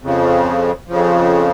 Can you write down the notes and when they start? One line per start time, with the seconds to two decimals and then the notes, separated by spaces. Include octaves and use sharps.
0.02 F2 C#3 F3
0.88 F2 C#3 F3